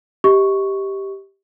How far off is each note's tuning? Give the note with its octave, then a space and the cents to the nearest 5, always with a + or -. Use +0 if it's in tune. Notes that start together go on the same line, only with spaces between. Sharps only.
G4 +0 D#5 +35 C#6 +0